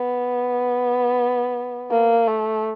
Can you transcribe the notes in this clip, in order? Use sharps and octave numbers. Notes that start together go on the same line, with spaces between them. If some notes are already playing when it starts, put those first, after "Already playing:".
Already playing: B3
A#3
A3